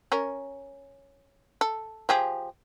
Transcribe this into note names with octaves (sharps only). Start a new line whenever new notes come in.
C#4 A#4
A4
F3 G4 G#4